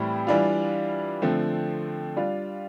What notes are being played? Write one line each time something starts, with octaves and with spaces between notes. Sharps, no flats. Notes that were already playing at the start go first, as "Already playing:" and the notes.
Already playing: A2 E3 G3 C4
E3 G3 D4 F4
D3 F3 A3 C4
G3 D4 F4